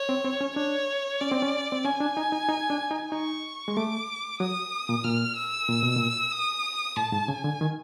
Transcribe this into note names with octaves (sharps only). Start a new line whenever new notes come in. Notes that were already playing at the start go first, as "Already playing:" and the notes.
Already playing: C#5
C4
C4
C#4
D4 C#5
C#4 D5
C4
C#4
C4
C#4 G#5
D4
D#4
D#4
D#4
D4
D#4
D#4 C#6
G#3
A3 D6
F#3 D#6
A#2
A#2 F6
E6
A#2
B2
A#2
D#6
A2 A5
G#2
C#3 G#5
D3
D#3